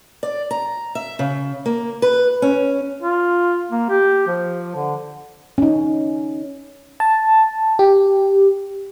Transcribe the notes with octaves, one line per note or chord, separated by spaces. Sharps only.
D5
A#5
E5
C#3
A#3
B4
C#4
F4
A#3
G4
F3
D3
C#4 D#4
A5
G4